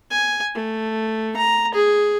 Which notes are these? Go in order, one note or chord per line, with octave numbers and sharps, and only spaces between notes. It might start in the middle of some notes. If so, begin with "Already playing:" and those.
G#5
A3
A#5
G#4